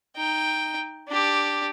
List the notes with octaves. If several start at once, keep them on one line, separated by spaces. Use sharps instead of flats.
D#4 G5
D4 G4